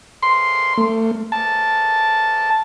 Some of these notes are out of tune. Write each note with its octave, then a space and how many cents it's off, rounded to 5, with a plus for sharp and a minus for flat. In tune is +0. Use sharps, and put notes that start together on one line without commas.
C6 +0
A3 +30
A5 -5